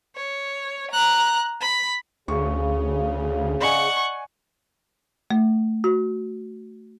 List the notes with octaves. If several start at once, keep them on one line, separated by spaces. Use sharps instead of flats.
C#5
A#5 F#6
B5
D2 C#3 C#6
D5 D#5 F#5 G#5 C#6
A3
F#4